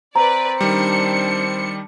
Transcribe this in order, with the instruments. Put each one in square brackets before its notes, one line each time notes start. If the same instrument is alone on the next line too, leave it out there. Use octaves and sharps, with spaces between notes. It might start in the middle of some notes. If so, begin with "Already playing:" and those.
[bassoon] C4 [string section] B4 D5 [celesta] A#5
[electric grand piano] D#3 G3 [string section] D4 C#7